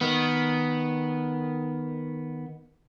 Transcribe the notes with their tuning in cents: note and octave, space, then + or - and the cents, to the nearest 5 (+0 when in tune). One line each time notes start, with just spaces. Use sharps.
D#3 +0 B3 -5